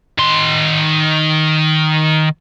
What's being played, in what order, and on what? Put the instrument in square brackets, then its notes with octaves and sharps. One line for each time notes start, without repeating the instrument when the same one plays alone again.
[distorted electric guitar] D#3 C6